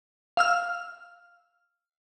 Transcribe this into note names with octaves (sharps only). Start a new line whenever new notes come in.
F5 E6 F6